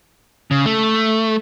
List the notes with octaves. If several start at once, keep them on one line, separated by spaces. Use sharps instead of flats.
C#3
A3